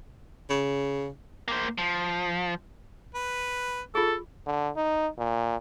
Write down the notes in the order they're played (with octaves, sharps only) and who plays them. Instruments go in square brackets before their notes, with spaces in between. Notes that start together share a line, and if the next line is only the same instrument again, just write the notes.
[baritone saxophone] C#3
[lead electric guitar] A#3 C5
F3
[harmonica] B4
[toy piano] F4 G#4 [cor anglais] A4
[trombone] D3
D#4
A#2